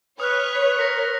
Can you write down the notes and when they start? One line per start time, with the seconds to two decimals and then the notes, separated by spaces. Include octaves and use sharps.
0.20 B4 C#5 D#6 F6 F#6
0.77 A#4 A#6 B6 C#7